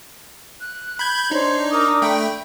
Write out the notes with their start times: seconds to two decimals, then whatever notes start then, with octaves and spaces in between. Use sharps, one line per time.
0.59 F#6
0.99 B5 G6 G#6
1.31 D4 D#4 C5 C#5
1.71 A#4 D6 D#6
2.02 A3 G5 B5